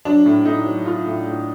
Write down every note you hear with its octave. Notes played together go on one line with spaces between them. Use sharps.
F#3 D4
A2
A2 D#4
F#3
F#3 F4
A2
A2